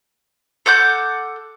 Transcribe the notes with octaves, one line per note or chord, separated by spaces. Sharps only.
A4 F#5 D6 G6